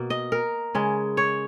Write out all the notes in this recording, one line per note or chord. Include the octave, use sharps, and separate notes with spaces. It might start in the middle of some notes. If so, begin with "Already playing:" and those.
Already playing: B2 A#3
D#5
A#4
C#3 G#3
C#5